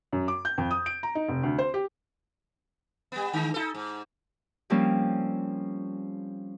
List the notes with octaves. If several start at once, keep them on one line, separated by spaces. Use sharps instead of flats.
F#2
D6
G6
F2
D#6
D7
A#5
D#4
F1
D2
C5
G4
G3 B3
D3 G#3
D#4 E4 A4
G#2
F3 G3 A#3 C4 C#4